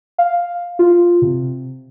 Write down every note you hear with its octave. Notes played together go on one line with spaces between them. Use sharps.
F5
F4
C3